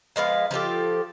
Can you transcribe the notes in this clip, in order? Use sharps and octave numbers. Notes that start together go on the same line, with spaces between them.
F3 G#3 B3 F5
F3 F4 G4 A4